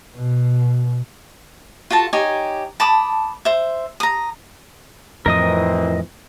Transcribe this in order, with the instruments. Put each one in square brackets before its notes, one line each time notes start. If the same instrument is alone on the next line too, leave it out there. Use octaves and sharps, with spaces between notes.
[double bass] B2
[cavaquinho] F4 F#4 A4 A5
D#4 G4 C#5 G#5
A5 B5 D6 D#6
C5 E5
A#5 D#6
[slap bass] F2 A2 F3 [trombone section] E3 C4 [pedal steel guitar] A#4 D#5 D#6